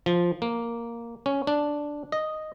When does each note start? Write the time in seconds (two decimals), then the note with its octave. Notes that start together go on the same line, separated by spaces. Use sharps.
0.06 F3
0.42 A#3
1.26 C#4
1.47 D4
2.12 D#5